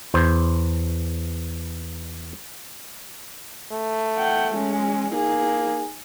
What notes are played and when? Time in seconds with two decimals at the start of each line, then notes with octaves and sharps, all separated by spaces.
0.14 E2 C5
3.72 A3
4.18 F#5 G5
4.54 G#3 C#4
5.14 A#3 D#4 G#4